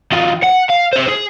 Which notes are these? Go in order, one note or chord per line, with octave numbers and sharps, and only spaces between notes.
D#3 F3
F#5
F5
G4 C5
G#4